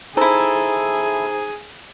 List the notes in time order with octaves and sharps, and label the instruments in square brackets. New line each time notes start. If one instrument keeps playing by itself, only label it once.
[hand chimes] D#4 C5 A#5 [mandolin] E4 A4 [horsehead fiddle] G#4